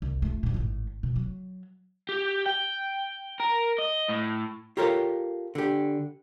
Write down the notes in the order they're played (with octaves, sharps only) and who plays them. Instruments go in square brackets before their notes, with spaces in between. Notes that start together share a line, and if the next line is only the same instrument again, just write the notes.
[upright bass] C2
A3 F4
F2 A#2
G#1 A2
B2
F#3
[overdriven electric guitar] G4
G5
A#4
D#5
A2
[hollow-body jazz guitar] F4 G4 A4 A#4 C#5 F5
D3 G4